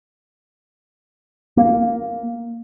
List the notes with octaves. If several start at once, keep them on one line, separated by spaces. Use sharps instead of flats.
A#3